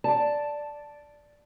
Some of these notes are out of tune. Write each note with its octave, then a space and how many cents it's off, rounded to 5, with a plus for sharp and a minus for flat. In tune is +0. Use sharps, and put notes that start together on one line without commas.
D5 +0 A5 +0